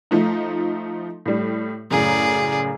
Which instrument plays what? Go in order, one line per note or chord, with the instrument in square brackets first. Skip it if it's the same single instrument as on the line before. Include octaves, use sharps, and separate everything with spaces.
[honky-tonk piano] F3 A3 D#4
A2 G3
[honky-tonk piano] F#2 A2 C#3 [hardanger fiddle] G#4 D5